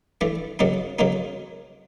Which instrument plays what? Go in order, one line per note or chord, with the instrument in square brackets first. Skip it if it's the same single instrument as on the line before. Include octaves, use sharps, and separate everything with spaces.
[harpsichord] E3 A3 D4
C#3 F#3 A#3 D#4
C#3 F#3 A#3 D#4